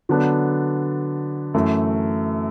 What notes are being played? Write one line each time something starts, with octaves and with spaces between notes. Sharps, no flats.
D3 F#3 B3 D4 A4
F#2 E3 A3